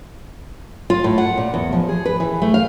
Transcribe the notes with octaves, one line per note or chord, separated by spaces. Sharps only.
F4
A2
F#5
A#2
E2
F3
G#4
B4
E3
A3
F5